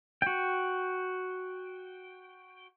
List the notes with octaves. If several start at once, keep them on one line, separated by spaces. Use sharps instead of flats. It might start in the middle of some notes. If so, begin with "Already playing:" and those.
F#4 G5